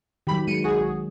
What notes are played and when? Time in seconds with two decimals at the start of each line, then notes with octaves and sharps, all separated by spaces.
0.27 D#3 F#3 G4 B5
0.47 G#3 C#7 D#7
0.63 B1 F#4 G#4